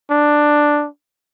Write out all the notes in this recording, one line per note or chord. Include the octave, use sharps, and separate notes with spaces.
D4